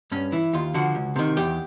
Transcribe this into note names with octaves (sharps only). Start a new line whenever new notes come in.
G2 C#4
E3 E4
D#2 F4
D3 F3 F#4
C#2
C3 D#3
E2 G4